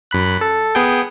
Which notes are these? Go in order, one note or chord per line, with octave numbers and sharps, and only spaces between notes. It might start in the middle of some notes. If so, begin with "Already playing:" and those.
F#2 B5 F#6
A4
B3 G#4 G5